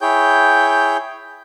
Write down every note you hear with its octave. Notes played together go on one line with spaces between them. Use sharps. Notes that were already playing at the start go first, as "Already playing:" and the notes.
E4 G#4 C#5 G5 G6